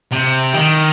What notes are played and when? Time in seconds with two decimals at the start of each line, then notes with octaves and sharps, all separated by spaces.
0.12 C3
0.54 D#3